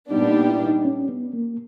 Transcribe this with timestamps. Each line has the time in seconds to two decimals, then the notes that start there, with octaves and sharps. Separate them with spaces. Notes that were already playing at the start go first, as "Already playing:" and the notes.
0.11 A#2 G3 B3 D4 D#4 G4
0.30 D#4
0.48 E4
0.67 D#4
0.85 C#4
1.09 B3
1.33 A#3